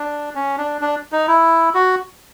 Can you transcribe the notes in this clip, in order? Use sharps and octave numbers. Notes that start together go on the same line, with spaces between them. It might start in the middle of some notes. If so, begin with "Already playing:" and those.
Already playing: D4
C#4
D4
D4
D#4
E4
F#4